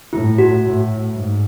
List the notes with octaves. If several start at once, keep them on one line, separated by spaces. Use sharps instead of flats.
A2 E4
F#4
A2
G#2